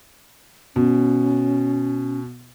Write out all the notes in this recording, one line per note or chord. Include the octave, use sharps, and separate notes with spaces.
B2 C#4